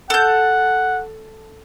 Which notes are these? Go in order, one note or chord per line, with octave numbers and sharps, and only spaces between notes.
A4 F#5 G6